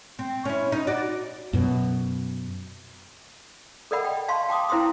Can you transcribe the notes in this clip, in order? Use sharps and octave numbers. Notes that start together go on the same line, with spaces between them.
C4
C#4 E4
D#4
F#4 D5
F#2 B2
A4 A#4 D5 D#5 F#5 B5
G5
F5 A5 C6 C#6
G5 A5 D6 D#6
E4 C5 F5 G5 C6 D#6